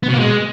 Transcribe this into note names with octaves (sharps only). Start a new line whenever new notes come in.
B3
B2
A#3
G#3